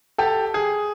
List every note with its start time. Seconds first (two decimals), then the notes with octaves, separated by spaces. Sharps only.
0.18 G4 A4
0.54 G#4